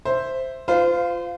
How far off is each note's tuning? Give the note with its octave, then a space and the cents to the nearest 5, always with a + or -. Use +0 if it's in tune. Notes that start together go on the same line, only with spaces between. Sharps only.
C5 +0 E5 +0
F4 -5 C5 -35 F5 +0